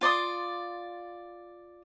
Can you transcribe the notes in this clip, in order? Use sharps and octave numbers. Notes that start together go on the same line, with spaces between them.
F4 D5 C6 D#6